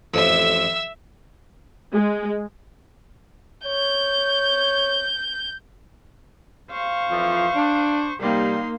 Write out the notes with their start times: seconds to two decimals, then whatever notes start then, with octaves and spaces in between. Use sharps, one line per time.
0.14 A1 F2 E5 E6
1.93 G#3
3.66 C#5 G6
6.71 C5 F5 C#6
7.10 F2 E3 F3
7.56 D4
8.21 C3 G3 A#3 D#4 C6